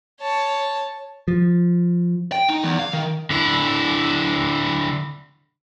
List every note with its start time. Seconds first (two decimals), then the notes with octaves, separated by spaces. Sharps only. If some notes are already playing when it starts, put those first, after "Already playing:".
0.21 C#5 A5
1.28 F3
2.32 G5
2.49 D#4
2.64 E2
2.79 F5
2.93 D#3
3.30 D3 E4